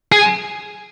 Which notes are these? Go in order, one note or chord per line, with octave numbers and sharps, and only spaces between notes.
G#4